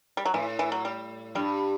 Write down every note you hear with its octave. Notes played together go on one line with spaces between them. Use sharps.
G3
F#3
A2 E3
E3
F#3
G3
G2 G3